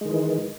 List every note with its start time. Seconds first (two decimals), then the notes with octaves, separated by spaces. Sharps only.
0.01 G#3
0.05 D#3
0.10 E3